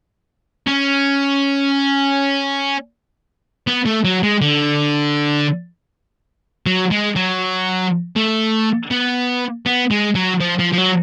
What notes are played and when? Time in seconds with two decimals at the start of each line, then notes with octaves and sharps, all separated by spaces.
0.67 C#4
3.67 B3
3.86 A3
4.05 F#3
4.23 G#3
4.42 D3
6.66 F#3
6.91 G#3
7.16 F#3
8.16 A3
8.91 B3
9.66 B3
9.91 G#3
10.15 F#3
10.41 F3
10.59 F3
10.73 F3
10.78 F#3